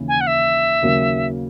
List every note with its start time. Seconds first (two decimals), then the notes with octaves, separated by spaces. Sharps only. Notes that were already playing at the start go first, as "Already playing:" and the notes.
Already playing: D#2 C#3 E3
0.08 G#5
0.21 F#5
0.27 E5
0.83 D#2 C#3 F#3 A#3